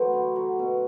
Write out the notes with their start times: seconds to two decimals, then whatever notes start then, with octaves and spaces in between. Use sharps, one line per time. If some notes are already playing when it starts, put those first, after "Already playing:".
Already playing: E3 F#3 A3 C5
0.13 D3
0.36 F#3
0.59 B2